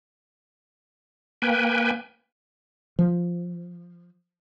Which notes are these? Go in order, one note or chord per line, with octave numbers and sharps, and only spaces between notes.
A#3 B4 G5 G#5
F3